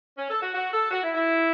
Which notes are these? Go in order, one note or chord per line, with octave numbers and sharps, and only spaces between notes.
C#4
A4
F#4
F#4
A4
F#4
E4
E4